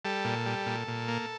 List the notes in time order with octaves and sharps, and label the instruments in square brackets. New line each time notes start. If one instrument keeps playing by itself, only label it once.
[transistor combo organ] G3 A4
A#2
G3
A#2
A#2
A#3